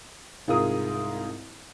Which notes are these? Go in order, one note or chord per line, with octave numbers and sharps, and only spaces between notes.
C2 G#2 F4 G#4 A#4 D#6